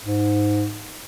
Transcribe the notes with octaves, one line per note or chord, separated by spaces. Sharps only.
G#2